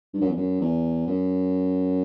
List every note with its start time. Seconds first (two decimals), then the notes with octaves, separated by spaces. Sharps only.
0.14 G2
0.21 F#2
0.29 E2
0.36 F#2
0.61 E2
1.07 F#2